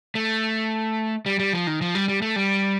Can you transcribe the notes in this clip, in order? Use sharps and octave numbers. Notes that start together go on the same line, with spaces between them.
A3
G3
G3
F3
D#3
F3
G3
G3
A3
G3